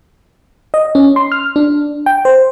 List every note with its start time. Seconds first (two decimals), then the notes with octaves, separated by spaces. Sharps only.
0.74 D#5
0.95 C#4
1.16 C6
1.32 F6
1.56 D4
2.06 G5
2.25 C5